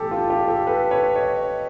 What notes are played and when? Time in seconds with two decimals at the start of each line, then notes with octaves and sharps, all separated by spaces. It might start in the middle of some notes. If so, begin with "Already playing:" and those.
Already playing: B1 A2 E3 G4 A4
0.11 F4 G4
0.30 F4 G4
0.48 G4 A4
0.67 A4 B4
0.91 B4 C#5
1.16 C#5 D#5